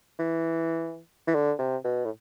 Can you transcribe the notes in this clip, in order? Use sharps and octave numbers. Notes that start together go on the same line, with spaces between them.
E3
E3
D3
C3
B2
A2